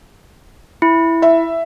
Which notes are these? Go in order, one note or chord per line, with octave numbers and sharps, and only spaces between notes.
E4
E5